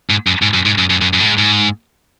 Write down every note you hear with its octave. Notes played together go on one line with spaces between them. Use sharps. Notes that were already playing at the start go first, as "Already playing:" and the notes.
G#2
F#2
G#2
F#2
G#2
F#2
F#2
F#2
F#2
A2
G#2
G#2